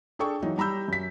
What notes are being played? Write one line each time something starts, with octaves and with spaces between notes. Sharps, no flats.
D4 G#4 A4 G5 C#6
E3 F#3 D#4
G3 A#5 B5 E6 G6
F#2 B6